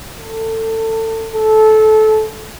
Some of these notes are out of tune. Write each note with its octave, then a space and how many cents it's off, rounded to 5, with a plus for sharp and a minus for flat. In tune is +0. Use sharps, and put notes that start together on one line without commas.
A4 +25
A4 -20